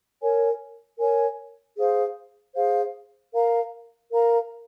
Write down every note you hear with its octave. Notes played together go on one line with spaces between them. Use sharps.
A#4 C#5 G#5
A#4 C#5 G#5
G#4 C5 F5
G#4 C5 F5
A#4 F5 A#5
A#4 F5 A#5